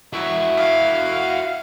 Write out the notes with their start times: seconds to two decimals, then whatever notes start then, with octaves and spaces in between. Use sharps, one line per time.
0.13 E4 F#4 E5 C#6
0.57 F5